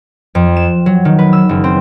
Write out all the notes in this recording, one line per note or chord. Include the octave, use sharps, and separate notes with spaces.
F2
E7
F#3
D#3
B4
E6
F#1
C4